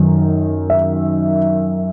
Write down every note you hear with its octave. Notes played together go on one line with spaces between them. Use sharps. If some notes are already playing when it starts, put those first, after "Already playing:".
Already playing: F#2 D#3
E5